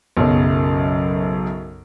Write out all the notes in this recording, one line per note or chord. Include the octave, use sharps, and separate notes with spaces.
B1 F#2 C#3